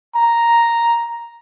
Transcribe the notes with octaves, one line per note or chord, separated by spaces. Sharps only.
A#5